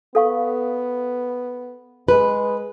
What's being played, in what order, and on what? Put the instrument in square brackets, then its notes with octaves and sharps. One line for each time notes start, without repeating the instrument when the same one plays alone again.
[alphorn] B3 [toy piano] A4 F5 C#6
[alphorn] G#3 [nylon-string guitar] B4